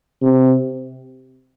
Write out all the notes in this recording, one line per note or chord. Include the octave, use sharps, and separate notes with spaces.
C3